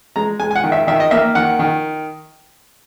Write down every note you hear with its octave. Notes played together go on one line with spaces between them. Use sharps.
G#3 A#5
G#3 G#5
G#5
F#5
D#3
E5
D#3 E5
D#5
A#3 E5
D#3 F#5
D#3